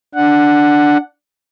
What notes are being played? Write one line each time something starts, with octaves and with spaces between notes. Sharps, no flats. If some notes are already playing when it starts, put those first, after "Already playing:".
D4 F#5